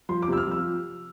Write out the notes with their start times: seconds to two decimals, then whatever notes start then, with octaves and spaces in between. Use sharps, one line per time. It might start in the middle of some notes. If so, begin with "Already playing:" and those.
0.09 F3 C6
0.22 D6
0.28 C3 E6
0.37 F6
0.47 F3 E6